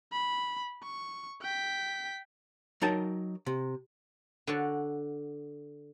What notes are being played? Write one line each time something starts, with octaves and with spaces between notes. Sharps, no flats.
B5
C#6
G5 B6
F#3 D#4 A#4 G5 A5
C3
D3 F#4 C#5 A5